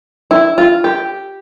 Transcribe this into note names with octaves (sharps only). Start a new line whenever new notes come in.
E4
F4
G4